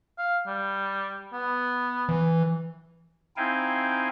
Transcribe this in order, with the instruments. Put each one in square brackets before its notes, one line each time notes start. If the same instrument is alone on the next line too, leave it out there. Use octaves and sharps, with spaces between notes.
[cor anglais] F5
G3
B3
[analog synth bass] E3
[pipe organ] C4 D#4 E4 F5 G5 G#5